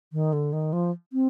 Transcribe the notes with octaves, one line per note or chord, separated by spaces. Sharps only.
D#3
D3
D#3
F3
C4